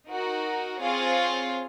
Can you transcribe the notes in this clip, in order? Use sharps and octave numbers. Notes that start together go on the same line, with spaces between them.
D#4 F#4 A#4
C4 F4 G#4 C#5 F5